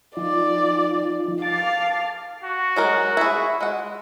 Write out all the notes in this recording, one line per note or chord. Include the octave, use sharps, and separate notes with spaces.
F3 D#4 F4 D5
F5 A5 D6 A6
F#4
F#3 G#3 A#4
E4 G#4
G#3 F#5